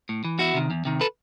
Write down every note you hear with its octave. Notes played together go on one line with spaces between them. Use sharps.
A2
E3
E2 E4 F#4
C3 D#3
E2
C3 D#3
A4 B4